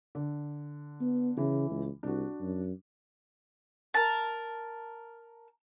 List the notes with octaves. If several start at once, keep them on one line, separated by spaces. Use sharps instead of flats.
D3
B3
C#3 E3
C#2
C2 D4 F#4
F#2
A#4 A5